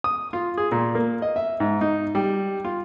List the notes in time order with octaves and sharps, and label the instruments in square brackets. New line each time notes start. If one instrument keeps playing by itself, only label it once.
[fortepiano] D#6
F4
G#4
A#2
A#3
D#5
E5
G#2
D#4
G3
F4